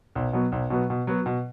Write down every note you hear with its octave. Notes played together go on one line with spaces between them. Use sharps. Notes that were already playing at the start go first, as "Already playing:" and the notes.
B1
B2 F#3 B3
B1
B2 F#3 B3
B2
F#3 B3 F#4
B2